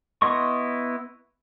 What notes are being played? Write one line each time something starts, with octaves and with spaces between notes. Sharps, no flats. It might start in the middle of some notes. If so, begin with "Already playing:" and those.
B3 E4 D#5 C6 C#6